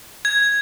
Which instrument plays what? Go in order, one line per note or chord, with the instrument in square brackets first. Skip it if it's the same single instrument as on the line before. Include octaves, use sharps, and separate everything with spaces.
[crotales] G#6